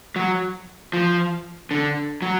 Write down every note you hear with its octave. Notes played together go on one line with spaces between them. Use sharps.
F#3
F3
D3
F#3